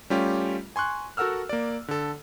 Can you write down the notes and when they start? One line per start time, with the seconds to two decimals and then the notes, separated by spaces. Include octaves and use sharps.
0.10 G3 A3 C#4 F4 G4
0.76 G#5 C6 C#6 F#6
1.17 F#4 A4 A#4 F#5 E6 F6
1.49 A#3 D5
1.88 D3 A4